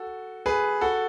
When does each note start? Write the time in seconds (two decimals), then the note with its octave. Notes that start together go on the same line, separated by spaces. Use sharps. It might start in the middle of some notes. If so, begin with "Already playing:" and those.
Already playing: F#4 A4
0.46 G#4 B4
0.81 F#4 A4